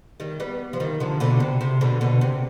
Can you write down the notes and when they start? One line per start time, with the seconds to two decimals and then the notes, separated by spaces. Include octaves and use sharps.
0.20 D#3 G3
0.40 G3 B3
0.73 F3
0.80 D#3 G3
1.00 D3 F3
1.20 B2 D3
1.40 C3
1.61 C3
1.81 B2 D3
2.01 B2 D3
2.21 C3